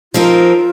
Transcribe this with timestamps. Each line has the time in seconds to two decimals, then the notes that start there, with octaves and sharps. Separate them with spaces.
0.14 F3 C4 D#4 F4 A#4